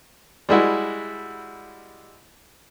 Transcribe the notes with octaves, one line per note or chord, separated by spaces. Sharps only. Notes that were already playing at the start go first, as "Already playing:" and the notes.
G3 G#3 E4 F#4